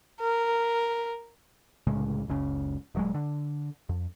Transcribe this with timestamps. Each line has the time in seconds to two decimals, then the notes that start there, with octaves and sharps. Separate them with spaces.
0.20 A#4
1.87 C2 A2 C#3 G#3
2.28 F#1 C#2 C#3
2.95 D#1 F#3 G#3
3.14 D3
3.89 F2